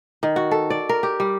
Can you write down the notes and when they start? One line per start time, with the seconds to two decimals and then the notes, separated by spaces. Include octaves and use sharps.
0.23 D#3
0.36 F#4
0.51 A4
0.70 D5
0.89 A#4
1.03 G4
1.20 G3